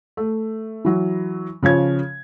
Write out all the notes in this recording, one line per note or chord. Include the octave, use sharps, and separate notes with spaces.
A3
E3 F#3
C#3 F3 C#5 G#6